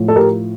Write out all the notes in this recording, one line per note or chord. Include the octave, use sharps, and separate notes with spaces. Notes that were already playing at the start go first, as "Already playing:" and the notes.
Already playing: A2 F3
A4
G4 A#4